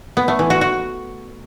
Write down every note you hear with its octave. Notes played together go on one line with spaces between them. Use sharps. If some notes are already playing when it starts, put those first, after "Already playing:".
B3
A3
E3
F#4
F#4